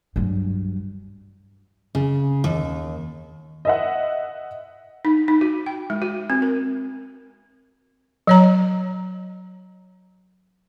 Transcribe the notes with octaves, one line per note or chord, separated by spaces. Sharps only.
G2 F#3
C#3
D#2
D#5 E5 F#5
D#4
D#4
F#4
G5
G#3
F#4
C4
A#4
F#3 C#5 A#5